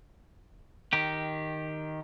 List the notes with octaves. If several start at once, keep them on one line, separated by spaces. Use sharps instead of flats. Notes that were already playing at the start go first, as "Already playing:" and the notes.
D#3 G4